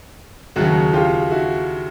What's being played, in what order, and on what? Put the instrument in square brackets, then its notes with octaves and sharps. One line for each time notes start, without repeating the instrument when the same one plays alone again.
[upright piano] D#2 C#3 F#3 E4 F#4
F4 G4
E4 F#4